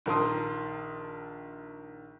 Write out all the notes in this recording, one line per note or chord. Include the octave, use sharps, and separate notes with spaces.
A#1 D#3 A#4 A5 C6 D#6